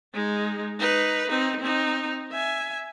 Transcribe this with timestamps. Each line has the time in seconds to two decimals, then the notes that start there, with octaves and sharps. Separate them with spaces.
0.14 G#3 D#4
0.80 D#4 B4
1.29 C4 D#4
1.60 C4 D#4
2.32 E5 G#5